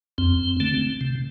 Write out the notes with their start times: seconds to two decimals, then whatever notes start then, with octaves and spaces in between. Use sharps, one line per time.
0.18 F2 C4
0.60 D3 A3 C4
1.01 C3